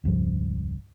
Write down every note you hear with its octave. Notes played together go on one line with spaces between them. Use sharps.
E1 C#2 G2 F3